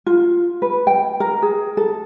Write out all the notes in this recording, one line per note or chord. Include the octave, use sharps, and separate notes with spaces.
F4
B4
G5
A#4
G#4
A4